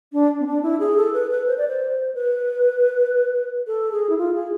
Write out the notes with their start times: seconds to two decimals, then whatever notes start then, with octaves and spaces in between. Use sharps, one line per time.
0.13 D4
0.40 C4
0.47 D4
0.63 E4
0.80 G#4
0.97 A4
1.13 B4
1.31 B4
1.47 C5
1.58 D5
1.68 C5
2.15 B4
3.67 A4
3.92 G#4
4.10 E4
4.18 F4
4.34 G#4